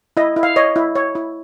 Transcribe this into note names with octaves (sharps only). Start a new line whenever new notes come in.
E4 D#5
E4
F5
C#5 D#5
E4
C#5
E4